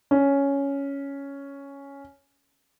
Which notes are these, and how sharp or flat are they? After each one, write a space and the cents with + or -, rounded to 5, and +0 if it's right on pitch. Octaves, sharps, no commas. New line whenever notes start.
C#4 +5